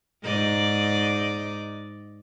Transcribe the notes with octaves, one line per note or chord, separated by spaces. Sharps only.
G#2 D5 D#5